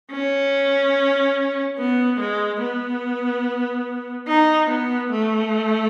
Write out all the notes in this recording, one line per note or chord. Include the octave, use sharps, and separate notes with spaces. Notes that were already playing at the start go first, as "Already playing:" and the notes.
C#4
B3
G#3
B3
D#4
B3
A3